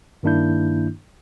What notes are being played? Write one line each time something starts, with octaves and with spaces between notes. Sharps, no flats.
G2 D#3 A#3 D4 E4 G6